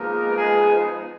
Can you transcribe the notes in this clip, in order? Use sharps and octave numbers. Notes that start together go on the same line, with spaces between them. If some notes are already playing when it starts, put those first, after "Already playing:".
Already playing: F3 G#3 A#3 B3 D#4 A#4
G#3 G#4